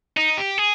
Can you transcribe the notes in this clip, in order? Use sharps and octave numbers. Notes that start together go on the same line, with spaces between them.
D#4
G4
G#4